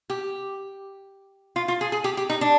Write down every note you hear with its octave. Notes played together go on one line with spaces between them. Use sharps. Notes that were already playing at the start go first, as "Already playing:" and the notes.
G4
F4
F4
G#4
G#4
G4
G4
D#4
D4